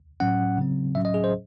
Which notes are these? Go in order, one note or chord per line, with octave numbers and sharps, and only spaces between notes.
A2 F#3 C#4 F#5
C#3 F#3 C4
A2 F#3 C#4 E5
D#5
G#4
C5